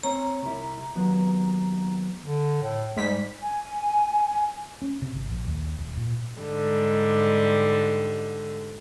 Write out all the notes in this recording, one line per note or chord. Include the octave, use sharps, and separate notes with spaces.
C4 C#5 A#5
C2 E4
D#2 F#3 B3
D3
A2
G#2 G3 B6
G#5
C#4
C3
G#1
A#1
D#2
D#1
A#2
G#2 D3 G3